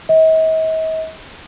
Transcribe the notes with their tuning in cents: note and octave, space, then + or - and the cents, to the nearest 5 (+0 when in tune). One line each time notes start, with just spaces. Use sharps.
D#5 +45